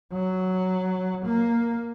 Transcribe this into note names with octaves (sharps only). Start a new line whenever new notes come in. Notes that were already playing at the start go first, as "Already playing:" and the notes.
F#3
A#3